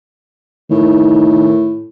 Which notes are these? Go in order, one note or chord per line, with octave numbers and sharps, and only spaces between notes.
A2 D#3